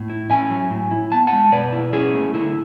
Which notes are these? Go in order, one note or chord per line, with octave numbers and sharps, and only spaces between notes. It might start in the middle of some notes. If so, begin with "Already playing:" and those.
Already playing: A2
E4
C#4 E5 G#5
F#3
A2
E4
B3 A5
F#5 A5
G#3
B2 B4 D5
E4
C#4 E4 G#4
A3
D3 E4